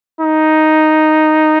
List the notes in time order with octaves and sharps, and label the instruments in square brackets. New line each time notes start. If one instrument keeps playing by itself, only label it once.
[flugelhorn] D#4